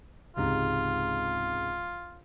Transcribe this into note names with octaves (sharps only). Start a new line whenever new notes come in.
C#2 G#2 C3 F4